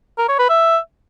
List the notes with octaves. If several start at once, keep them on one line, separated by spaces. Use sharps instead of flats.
A#4
C#5
B4
E5